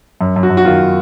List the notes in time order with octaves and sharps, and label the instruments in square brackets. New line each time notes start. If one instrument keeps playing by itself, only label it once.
[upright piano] F#2
F#2
F#4
F#2
F#4
D#3 F4